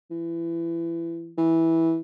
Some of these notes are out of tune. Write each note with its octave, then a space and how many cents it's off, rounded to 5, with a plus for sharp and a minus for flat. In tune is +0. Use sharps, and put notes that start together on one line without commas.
E3 +25
E3 -10